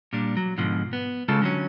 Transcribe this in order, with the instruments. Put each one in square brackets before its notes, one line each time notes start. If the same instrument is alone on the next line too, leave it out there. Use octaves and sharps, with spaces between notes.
[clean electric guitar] A#2 G3 D4
F#3
G#2 B2 D3 F3
B3
C#3 G#3 F4 A4 A5
D3 F#3 C#4